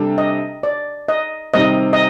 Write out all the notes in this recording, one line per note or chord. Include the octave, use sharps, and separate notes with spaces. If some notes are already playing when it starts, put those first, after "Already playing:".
Already playing: C3 G3 D4 A4
D#5
D5
D#5
C3 D#3 G3 C4 D#5
D#5